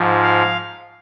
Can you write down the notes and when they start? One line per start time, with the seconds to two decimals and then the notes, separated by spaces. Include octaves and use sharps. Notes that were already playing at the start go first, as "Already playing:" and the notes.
Already playing: G#2 F3
0.21 F5